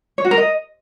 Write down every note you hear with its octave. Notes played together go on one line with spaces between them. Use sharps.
C#5
F#4
A#4
D#5